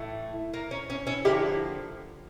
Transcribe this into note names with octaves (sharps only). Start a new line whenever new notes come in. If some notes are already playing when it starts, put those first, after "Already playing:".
Already playing: A2 E3 A3
A#3
C#4
C#4
C#4 E4
D3 F3 A#3 E4 G4